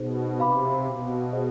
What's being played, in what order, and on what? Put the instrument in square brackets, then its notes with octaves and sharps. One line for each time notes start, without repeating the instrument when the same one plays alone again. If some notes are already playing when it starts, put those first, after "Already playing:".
Already playing: [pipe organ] B2 [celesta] D#4 G#4 C5
[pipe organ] C3 [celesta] B4 F5 B5 D6
[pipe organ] B2
[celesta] G#4 C5 D#5